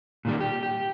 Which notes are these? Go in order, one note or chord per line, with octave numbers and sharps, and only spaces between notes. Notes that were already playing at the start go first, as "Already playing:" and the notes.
A#2 D#3 G3
G4
G4